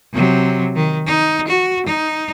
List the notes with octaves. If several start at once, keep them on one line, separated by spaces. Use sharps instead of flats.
C3 F#3
D#3
D#4
F#4
D#4